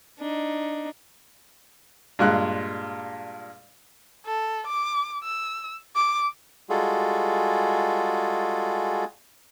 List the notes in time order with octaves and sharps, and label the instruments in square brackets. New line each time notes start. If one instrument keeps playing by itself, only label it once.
[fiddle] D4 D#4
[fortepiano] G2 A#2 G#3 F#6
[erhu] A4
D6
E6
D6
[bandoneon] G3 G#3 F4 F#4 G#4 A4